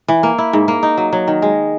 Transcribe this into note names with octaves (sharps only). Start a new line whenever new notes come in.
E3
A#3
E4
G#2
A#3
D#4
F#3
F#3
D#3
G#3